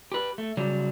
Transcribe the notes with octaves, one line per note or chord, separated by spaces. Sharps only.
G4 B4
A3
C#3 F#3 G3